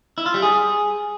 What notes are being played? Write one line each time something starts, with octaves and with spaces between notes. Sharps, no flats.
E4
F4
G3
G#4